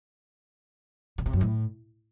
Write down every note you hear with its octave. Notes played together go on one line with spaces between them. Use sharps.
C#3
C3
F#2
A2